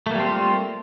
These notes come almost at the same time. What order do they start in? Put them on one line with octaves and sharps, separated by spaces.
A3 A#3 G3 C4 F4